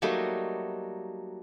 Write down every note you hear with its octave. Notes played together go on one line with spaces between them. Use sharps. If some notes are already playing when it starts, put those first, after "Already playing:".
F#3 G3 A3 A#3 D#4 F#4